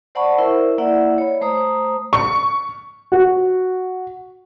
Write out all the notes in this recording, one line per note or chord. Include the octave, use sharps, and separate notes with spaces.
C5 D5 F#5 A5 B5 C#6
E4 A#4 C5 E5
A#3 E4 D5 E5 F#5
C#5 B5
A3 C5 A#5 D#6
C#6
F#4